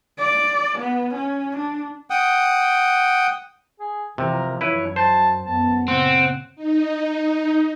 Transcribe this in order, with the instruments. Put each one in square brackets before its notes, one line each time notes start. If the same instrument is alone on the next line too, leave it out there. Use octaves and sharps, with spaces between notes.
[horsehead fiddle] D5
B3
C#4
D4
[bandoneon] F#5 G5 D#6
[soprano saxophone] G#4
[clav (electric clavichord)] C3 [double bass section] E3 F3 [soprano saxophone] A#4
[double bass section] F#2 F#3 [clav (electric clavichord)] E4 B4 [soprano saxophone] C#5
[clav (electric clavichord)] C5 [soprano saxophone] A5
[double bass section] F#2 B3 [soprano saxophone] A5
[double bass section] A#2 C#3 [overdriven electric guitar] C4 [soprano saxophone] F#5
[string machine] D#4